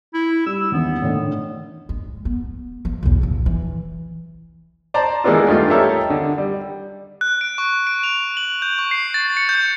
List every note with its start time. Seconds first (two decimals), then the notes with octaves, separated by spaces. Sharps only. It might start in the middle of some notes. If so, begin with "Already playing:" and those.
0.14 E4
0.46 G3 E6
0.72 D#2 E3 B3
1.02 A2 D3 D#3
1.89 G#3
2.25 B3
2.85 F3 A#3
3.03 B1 E2
3.22 A#2 F3
3.46 E3
4.94 C5 D5 A5 A#5
5.24 E3 G#3 A#3 B3 D4 F4
5.48 G2 A3 D#4 F4
5.70 D#4 G4 A4 A#4 C#5 E5
6.10 D3
6.38 G3
7.21 F#6
7.41 D7
7.58 C#6
7.87 D7
8.04 F7
8.37 F#7
8.62 G6
8.79 C#6
8.91 C7
9.14 A6
9.37 C#7
9.49 G6